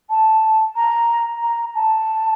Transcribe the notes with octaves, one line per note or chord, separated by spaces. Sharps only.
A5
A#5
A#5
A5